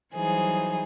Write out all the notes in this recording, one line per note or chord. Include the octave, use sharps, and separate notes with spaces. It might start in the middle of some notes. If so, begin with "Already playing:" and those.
E3 F#3 G3 D#4 G#4 C5